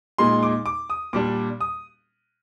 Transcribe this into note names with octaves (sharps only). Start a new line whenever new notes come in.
A#2 G#3 D#4 C6
D6
D6
D#6
A#2 G3 D4 D6
D#6